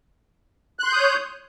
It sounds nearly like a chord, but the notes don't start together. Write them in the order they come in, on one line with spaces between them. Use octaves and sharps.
F#6 C6 G6 D#6 C#5